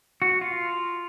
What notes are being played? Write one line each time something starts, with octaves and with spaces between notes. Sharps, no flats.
F#4
F4